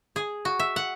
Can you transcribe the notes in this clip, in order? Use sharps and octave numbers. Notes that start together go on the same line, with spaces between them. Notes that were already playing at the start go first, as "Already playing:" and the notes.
G#4
F#4
E5
F#5